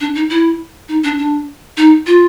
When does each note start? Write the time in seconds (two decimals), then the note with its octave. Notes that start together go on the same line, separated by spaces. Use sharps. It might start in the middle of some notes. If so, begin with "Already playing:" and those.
0.01 D4
0.15 D#4
0.30 E4
0.89 D#4
1.04 D4
1.18 D4
1.77 D#4
2.07 F4